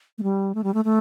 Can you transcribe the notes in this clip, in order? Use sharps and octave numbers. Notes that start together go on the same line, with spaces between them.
A3
G3
A3
G3
A3
A3